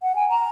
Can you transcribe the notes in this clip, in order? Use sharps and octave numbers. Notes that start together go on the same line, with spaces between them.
F#5
G#5
A#5